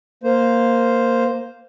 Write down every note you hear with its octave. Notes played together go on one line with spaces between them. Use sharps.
A#3 C5